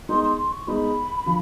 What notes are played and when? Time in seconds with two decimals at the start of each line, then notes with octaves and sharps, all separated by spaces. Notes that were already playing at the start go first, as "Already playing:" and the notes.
0.09 G#3 B3 D#4 G#4 C6
0.23 C6
0.38 C6
0.52 C#6
0.67 G#3 B3 D#4 G#4 B5
1.26 D3 F3